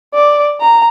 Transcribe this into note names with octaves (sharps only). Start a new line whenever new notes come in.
D5
A#5